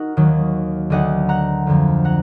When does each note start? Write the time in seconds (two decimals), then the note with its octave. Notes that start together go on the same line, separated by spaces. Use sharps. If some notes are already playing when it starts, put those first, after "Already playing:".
Already playing: D#4 F#4 A#4
0.17 D#2 D#3 F#3
0.90 D2 D3 F#3 D#5 F#5
1.29 F#5 A#5
1.67 F2 D3 F3
2.05 F#5 A#5